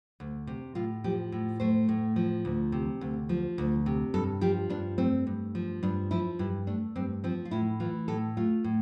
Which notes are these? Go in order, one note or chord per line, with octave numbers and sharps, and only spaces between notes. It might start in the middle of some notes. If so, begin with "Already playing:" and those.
D2
C3
A2 F4
F3 G4
A2
A3 C5
A2
F3
D2
C3
D2
F3
D2
C3
G2 A4
F3 G4
G2 D4
A3 C4
G2
F3
G2 D4
F3 E4
G2 E4
A3 D4
G2 C4
F3 C4
F4
A2 E4
E3 F4
A2 A4
A3 F4
A2